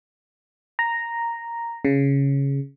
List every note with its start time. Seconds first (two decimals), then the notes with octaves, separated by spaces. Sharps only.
0.79 A#5
1.85 C#3